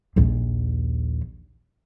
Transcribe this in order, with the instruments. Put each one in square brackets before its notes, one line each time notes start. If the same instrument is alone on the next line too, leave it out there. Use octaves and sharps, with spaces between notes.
[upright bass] A#1 D#2